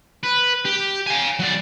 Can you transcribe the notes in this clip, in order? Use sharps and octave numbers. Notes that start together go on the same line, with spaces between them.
B4
G4
F5 G#5
F#3 D5